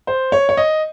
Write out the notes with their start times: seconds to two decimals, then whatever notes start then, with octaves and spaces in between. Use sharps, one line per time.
0.07 C5
0.32 C#5
0.49 C#5
0.57 D#5